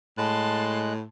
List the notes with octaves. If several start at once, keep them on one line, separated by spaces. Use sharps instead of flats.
A2 G#3 A5 C6 F#6